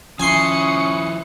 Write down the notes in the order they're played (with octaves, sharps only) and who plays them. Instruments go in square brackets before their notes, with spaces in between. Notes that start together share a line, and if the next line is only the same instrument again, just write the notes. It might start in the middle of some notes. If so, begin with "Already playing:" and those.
[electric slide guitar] F3 E4 [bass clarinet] C#4 [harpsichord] G#5 C6 [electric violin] D#6 C#7